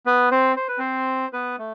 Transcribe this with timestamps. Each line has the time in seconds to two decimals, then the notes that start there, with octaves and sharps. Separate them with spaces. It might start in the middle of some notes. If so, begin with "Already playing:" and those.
0.06 B3 B4
0.31 C4 C5
0.56 C5
0.68 B4
0.78 C4 C5
1.33 B3 B4
1.59 A3